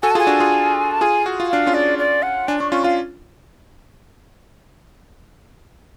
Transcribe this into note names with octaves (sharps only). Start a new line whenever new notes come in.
F#4 A4 G#5
A5
F4 G#4 G#5
D4 F#4
F4 G#4
A5
F4 G#4 G#5
F#4
F4
D4 F5
C#4 F4
D5
D5
F#5
D4 G#5
D4 C#6
C#4 F4 C#6
F4 F5